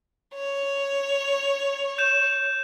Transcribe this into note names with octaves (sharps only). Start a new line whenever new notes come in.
C#5
G6 E7